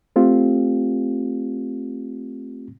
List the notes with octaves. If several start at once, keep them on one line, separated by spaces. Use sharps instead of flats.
A3 C4 F4 G4